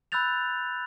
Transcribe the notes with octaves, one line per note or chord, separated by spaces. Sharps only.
B5 E6 F#6 G6 A6 F7